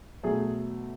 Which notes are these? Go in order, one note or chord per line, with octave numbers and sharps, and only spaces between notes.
B2 F#3 A3 G#4